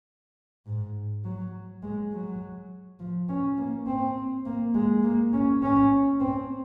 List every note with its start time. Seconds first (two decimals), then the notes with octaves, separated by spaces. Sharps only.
0.66 G#2
1.24 F#3
1.83 G#3
2.12 F#3
3.00 F3
3.29 C#4
3.58 A#3
3.87 C4
4.46 A#3
4.74 G#3
5.03 A#3
5.33 C#4
5.63 C#4
6.20 C4